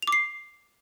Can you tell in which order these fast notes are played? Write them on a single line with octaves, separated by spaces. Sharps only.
F7 D6 C7